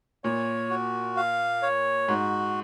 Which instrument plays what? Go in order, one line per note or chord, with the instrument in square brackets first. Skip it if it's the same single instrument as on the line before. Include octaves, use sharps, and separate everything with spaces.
[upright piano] A#2 [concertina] C#5
[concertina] F#4
F5
C#5
[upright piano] G#2 [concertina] F#4